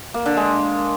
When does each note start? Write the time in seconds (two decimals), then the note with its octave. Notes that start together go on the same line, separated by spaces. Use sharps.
0.14 A#3
0.26 D3
0.37 G#3